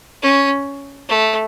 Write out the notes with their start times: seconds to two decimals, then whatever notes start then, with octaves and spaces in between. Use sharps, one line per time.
0.22 C#4
1.08 A3